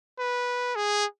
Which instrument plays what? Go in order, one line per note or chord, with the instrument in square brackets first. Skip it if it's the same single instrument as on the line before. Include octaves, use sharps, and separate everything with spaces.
[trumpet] B4
G#4